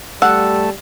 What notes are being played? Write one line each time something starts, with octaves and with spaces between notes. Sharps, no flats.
G3 A3 F#5 E6